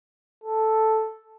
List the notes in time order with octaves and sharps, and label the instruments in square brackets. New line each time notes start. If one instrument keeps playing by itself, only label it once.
[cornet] A4